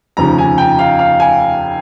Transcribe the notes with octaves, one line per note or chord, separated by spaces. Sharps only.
F1 D#2 C#3 F3 A#5
G#5
G5
F5
F5
G#5